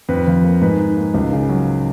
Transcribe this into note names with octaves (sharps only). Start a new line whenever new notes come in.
F2 B4
F3
A#3
G#2 B4
D#3
A#3
C#2
C#3
F#3